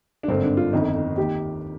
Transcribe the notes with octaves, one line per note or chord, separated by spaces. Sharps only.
D4
G#1 G2 D3 C4
D4
F4
G1 F2 D#3 D#4
D#4
D#2 D#3 G4